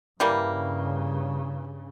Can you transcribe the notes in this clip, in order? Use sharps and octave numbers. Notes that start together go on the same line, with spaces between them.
G2 C#3 E3 G3 A#3